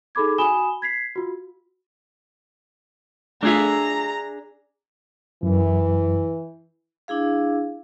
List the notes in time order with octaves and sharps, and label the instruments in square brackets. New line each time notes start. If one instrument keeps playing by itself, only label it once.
[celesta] D#4 G#4 A4 B5 D6 G#6
F#4 G#5 B5 D#6 E7 G7
G#6 B6 C7
F4 F#4
[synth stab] A3 F4 [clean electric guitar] D4 G#4 E5 [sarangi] A#5
[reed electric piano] F#2 [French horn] E3
[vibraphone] D4 E4 G#4 F5